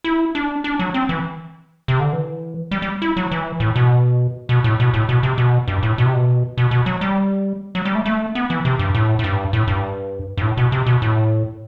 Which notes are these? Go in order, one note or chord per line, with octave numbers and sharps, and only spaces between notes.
E4
D4
D4
F#3
C4
E3
C3
D3
E3
G3
G3
E4
F#3
E3
A2
B2
B2
A2
B2
A2
B2
C3
B2
G2
A2
B2
C3
B2
B2
B2
F#3
G3
F#3
G3
A3
A3
B3
E3
C3
G2
A2
A2
G2
A2
G2
G2
A2
B2
C3
B2
A2